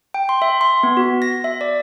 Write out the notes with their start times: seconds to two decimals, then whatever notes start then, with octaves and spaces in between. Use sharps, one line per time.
0.14 G5
0.29 C6
0.42 E5
0.61 C6
0.83 B3
0.97 F#4
1.22 A#6
1.44 E5
1.61 D5